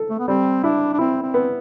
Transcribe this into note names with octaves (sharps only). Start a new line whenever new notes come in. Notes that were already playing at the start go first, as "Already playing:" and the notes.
Already playing: A4
A3
B3
G3 C4
D4 E4
D4
C4 E4
C4
B3